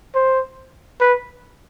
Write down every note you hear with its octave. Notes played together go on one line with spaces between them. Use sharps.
C5
B4